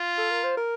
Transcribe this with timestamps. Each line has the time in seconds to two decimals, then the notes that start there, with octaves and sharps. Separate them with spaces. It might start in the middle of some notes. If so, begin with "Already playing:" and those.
Already playing: F4
0.18 A4
0.31 A#4
0.44 C5
0.57 A#4